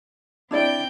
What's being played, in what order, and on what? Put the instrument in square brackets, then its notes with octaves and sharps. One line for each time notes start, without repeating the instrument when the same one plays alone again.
[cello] C4 G5 [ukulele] D4 E4 D5